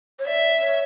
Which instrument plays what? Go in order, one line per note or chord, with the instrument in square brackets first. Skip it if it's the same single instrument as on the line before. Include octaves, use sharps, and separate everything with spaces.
[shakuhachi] C#5
[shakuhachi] D5 [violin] E5
[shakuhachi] C#5